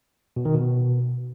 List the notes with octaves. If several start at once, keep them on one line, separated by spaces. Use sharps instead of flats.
B2
D#3
B2